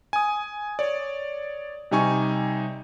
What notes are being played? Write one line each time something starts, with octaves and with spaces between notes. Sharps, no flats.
G#5 D#6
C#5 D5
C3 G3 D#4 G#5 C#6